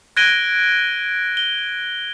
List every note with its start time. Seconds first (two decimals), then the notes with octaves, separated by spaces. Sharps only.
0.17 F#6 G#6 A#6 D7 D#7 G7
1.37 G7